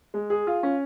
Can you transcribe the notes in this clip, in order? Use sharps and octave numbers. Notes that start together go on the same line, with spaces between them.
G#3
G#4
F4
C#4